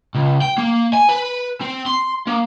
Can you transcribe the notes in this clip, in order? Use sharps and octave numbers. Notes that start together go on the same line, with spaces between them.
C#2
G5
A#3
G#5
B4
C4
C6
A#3